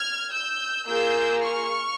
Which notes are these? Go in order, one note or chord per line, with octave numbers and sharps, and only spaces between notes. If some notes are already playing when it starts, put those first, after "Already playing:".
Already playing: F6 G#6
E6 G6
A#3 F4 G#4 E6 G6
C#6 F6